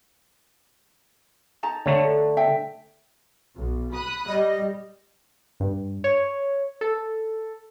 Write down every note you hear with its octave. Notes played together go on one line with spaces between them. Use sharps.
D#4 A5 A#5
D3 A3 C#5
A4
E5 G5
B1
B5 D#6 F#6
G3 D#5
G2
C#5
A4